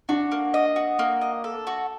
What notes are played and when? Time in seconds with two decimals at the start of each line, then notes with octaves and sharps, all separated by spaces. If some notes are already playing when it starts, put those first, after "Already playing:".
0.09 D4 F#4
0.32 A#3
0.54 D#5
0.76 F#4
0.99 A#3
1.22 D#5
1.44 A4
1.67 F#4